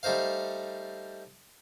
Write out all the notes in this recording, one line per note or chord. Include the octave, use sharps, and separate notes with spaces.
G3 A3 D#4 C5 F5